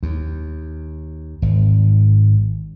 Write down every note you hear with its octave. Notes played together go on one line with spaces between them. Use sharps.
D#2
G#1